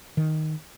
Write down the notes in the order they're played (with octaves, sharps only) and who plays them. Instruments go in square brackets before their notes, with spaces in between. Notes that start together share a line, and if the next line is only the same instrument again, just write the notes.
[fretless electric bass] D#3